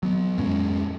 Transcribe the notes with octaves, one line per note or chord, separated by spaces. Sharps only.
F#3 B3
F2 A2 G#3 C#4